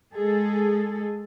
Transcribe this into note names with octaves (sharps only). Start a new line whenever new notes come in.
G#3 G#4 A4